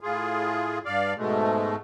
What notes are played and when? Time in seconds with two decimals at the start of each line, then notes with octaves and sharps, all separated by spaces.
0.01 A2 F4 G#4
0.85 G2 D5 F5
1.17 G#2 B2 G#3 A3